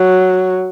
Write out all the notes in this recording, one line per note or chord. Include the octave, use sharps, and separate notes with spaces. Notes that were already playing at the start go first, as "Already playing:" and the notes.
Already playing: F#3